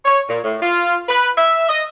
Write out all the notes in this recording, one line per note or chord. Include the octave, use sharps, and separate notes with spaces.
C#5
A#2
A2
F4
B4
E5
D#5